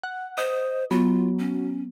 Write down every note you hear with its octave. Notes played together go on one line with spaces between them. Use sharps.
F#5
C5 D#5
F#3 B3 F4
C#4